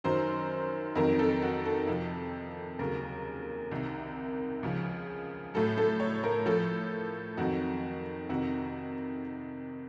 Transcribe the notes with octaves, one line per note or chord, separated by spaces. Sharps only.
F#2 D#3 F#3 C5
F2 D#3 F#3 A#4
A4
F#4
A4
F2 C3 F3
D#2 C#3 F#3 A#4
C2 C3 D#3
C#2 C#3 F3
A2 F#3 A4
A4
C#5
A#4
A2 F3 A4
F2 D#3 F#3 F#4
F2 C3 D#3 F#4